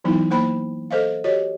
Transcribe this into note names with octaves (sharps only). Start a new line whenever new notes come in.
E3 F#3 B3 D#4 E4
A#3 C5 G5 B5
A4 C5 D#5 F5
F#4 G4 C#5 D#5